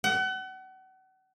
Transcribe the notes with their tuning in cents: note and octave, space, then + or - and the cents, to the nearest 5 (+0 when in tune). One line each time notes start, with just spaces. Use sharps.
F#5 +35